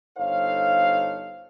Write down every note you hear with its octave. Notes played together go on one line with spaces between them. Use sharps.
G1 D#4 A4 C5 C#5 F5